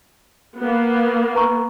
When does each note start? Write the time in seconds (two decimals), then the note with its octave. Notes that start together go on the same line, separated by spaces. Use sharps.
0.58 A#3 B3
1.35 B4 A#5 C#6